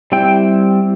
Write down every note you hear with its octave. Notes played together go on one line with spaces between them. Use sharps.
G3 C4 E4 G5